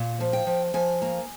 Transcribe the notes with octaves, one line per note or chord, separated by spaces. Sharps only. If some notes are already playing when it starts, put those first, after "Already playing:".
Already playing: A#2
F3
G5
F3
F3 G#5
A#3